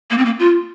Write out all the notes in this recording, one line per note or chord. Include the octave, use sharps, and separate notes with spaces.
A#3
C4
A#3
F4